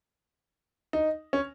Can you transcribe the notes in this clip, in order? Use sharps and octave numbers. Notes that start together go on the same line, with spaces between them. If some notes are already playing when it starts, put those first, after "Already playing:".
D#4
C#4